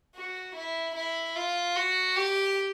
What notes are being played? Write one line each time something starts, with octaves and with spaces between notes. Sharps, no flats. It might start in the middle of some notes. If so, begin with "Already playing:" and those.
F#4
E4
E4
F4
F#4
G4